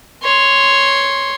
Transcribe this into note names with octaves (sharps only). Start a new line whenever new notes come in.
C#5 C6